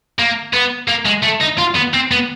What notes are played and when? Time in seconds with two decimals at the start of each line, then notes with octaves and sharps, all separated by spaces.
0.19 A#3
0.53 B3
0.88 A#3
1.06 G#3
1.23 A3
1.41 D#4
1.59 F4
1.76 B3
1.94 C4
2.11 B3